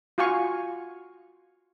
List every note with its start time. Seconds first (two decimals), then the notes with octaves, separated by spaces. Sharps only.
0.18 F4 F#4 F5 G#5 C#6